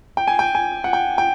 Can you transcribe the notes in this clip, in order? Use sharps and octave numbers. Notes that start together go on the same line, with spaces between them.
G5
G#5
G5
G#5
F#5
G5
G5